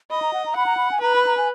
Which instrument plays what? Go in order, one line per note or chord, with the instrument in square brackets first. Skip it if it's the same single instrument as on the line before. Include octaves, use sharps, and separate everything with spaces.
[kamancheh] D#5 [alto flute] B5
[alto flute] A#5
F#5
A#5
[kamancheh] F#5 [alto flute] B5
[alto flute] A#5
B5
G#5
[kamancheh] B4 [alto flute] A#5
[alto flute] B5
A#5
G#5